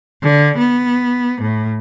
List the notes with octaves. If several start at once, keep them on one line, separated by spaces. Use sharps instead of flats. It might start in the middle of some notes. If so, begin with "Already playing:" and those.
D3
B3
A2